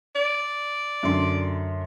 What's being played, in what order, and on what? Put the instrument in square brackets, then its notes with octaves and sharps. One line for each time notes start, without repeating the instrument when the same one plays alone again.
[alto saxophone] D5
[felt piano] F#2 D3 C6